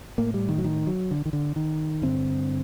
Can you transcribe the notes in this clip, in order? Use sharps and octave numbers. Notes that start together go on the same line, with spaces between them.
A2 A#3
G3
D#3
F#3
D#3
F#3
D3
D#3
D3
D#3
G2 D3 C4